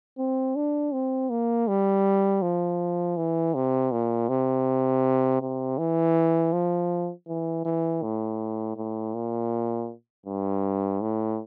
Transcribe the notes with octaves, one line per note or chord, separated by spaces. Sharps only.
C4
D4
C4
A#3
G3
F3
E3
C3
A#2
C3
C3
E3
F3
E3
E3
A2
A2
A#2
G2
A2